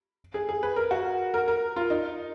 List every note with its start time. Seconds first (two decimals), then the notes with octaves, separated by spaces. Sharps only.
0.34 G#4
0.49 G#4
0.63 B4
0.76 A#4
0.91 F#4
1.34 A#4
1.48 A#4
1.76 F4
1.90 D#4